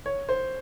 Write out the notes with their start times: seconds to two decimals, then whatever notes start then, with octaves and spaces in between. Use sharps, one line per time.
0.06 C#5
0.29 C5